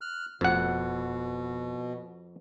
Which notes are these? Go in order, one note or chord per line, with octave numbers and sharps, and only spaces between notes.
F6 F#6
F1 F2 B2 F#5